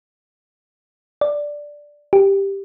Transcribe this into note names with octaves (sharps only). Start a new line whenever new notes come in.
D5
G4